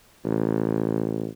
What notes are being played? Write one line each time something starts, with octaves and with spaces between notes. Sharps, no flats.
A1